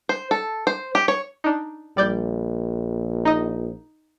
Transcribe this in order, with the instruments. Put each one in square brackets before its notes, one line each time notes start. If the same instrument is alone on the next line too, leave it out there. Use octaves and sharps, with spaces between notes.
[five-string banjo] C5
A4
C5
G4
C#5
[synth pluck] D4 D#4
[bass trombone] A#1 [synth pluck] G3 D5 G6
[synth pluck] D#4 D#5